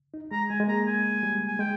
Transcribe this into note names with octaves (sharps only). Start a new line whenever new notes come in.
D#4
G#3 A#5
G#3 G#5
G#3
A#3 A#5
G#3 G#5
G3
G#5
G#3 G5